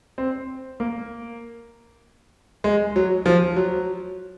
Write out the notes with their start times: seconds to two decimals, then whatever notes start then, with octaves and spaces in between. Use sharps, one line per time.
0.18 C4
0.80 A#3
2.64 G#3
2.96 F#3
3.26 F3
3.56 F#3